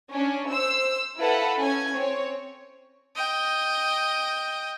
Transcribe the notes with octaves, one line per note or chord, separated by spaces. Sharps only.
C#4 D4
C5 E6
E4 A4 B4 F5 F#5
C#4 G#5
C4 C#5
D#5 G5